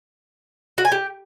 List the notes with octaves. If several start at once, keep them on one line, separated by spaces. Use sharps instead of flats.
F#4
G#5
G4